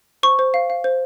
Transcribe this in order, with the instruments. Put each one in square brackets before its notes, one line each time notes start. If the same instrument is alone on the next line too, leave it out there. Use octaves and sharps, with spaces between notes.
[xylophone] C5 C#6
C5
F5
F5
C5